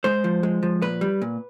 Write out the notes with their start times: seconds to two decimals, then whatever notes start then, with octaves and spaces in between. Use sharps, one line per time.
0.04 G#3 C5
0.24 F3
0.43 G#3
0.63 F3
0.82 A#2 B4
1.01 G3
1.22 A#2